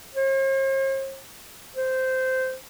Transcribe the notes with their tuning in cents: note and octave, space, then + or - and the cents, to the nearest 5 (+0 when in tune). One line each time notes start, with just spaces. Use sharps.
C5 +45
C5 -10